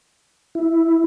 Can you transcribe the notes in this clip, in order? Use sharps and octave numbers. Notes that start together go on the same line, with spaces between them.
E4